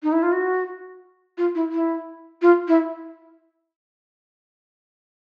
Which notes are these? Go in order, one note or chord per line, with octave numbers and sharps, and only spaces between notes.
D#4
E4
F4
F#4
F4
E4
E4
F4
E4